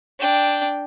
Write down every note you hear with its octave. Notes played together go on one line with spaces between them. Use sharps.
D4 G5